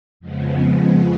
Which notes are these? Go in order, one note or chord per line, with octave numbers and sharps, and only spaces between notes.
F2 C#3 F3 G#3 B3